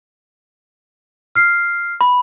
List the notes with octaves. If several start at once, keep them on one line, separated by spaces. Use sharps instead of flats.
F6 C7
B5